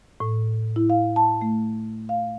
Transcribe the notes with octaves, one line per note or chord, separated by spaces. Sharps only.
A2
E4
F5
A5
A3
F5